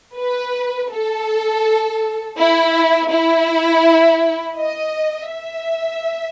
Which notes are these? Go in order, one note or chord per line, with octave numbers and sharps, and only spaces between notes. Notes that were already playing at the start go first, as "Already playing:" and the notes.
B4
A4
E4
E4
D#5
E5